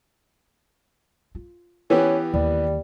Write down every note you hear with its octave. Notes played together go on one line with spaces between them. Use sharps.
F4
E3 B3 C#4 G4
D#2 D#3 G3